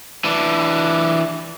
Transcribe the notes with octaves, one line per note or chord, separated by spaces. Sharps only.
E3 D4